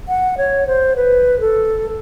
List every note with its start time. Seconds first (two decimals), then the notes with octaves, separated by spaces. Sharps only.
0.08 F#5
0.38 C#5
0.67 C5
0.96 B4
1.40 A4